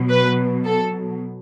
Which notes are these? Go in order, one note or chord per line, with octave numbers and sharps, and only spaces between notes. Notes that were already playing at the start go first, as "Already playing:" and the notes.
Already playing: B2 F#3
B4
A4